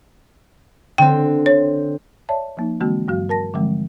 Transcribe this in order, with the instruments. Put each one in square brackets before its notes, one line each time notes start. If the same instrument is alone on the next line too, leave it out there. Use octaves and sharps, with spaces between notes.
[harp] D3 C4 [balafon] G5
[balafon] C#5
[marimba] C#5 D5 E5 A5
F3 A#3 D#4
D3 E3 G#3 A#3 C4 F#4
G2 F#3 F#4 F5
A#4 A5 A#6
D3 E3 F3 G3 G#3 C4